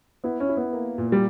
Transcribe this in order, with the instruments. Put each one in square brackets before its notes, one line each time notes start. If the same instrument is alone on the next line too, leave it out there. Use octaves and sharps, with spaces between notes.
[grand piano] B3 [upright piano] E4
[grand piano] C#4
[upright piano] E4
[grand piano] B3
[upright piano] A#3
A#2
[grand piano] G3